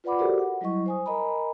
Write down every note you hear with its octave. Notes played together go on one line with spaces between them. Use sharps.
F4 B4 D5 F#5 B5 D6
F#4 G4 A4 A#4 C5 D5
F#5
F#3 G3 E4 D#5 C#6
C5 G#5 D#6
A#4 D#5 G#5 A#5 B5